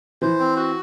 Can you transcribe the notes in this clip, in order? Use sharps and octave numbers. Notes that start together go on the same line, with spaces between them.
E3 C5
C4
F#4